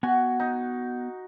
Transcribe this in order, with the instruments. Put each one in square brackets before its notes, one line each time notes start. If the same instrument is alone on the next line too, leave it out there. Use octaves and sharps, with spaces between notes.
[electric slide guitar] B3 G#5 [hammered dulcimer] F#4
[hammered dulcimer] D#4